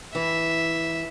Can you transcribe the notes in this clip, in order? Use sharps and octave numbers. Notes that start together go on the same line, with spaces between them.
E3 E5